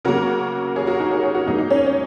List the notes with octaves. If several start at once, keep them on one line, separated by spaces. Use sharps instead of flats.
C#3 F#3 A#3 F#4 A#4
G#4 C#5
F#4 A#4
D#4 G#4
G#4 C#5
G#4 C#5
F#4 A#4
G#2 F#3 A#3 D#4 G#4
D#4
C#4
C#4